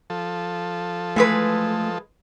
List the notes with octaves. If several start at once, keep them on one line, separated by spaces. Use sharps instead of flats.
F3 A4
E3 G#3 A3 B4